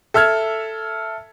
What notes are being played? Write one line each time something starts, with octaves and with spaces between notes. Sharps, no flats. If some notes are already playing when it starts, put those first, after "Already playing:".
A4 E5 E6 F6 G#6